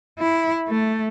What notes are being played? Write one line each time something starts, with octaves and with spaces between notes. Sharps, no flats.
E4
A3